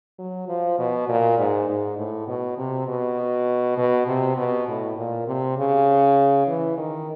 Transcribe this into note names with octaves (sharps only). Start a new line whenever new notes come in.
F#3
F3
B2
A#2
G#2
G#2
A2
B2
C3
B2
B2
C3
B2
A2
A#2
C3
C#3
E3
D#3